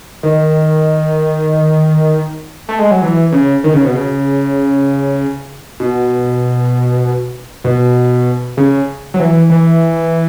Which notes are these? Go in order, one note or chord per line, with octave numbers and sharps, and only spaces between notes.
D#3
A3
G#3
F#3
E3
C#3
D#3
C#3
B2
C#3
B2
B2
C#3
F#3
E3
E3